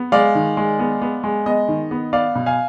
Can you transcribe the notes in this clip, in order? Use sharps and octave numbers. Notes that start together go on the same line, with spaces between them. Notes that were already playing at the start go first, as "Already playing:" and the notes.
Already playing: B3
G#3 D5 F5
D#3
G#3
B3
B3
G#3
B3 D#5
D#3
B3
B3 D5 F5
B2
F5 G#5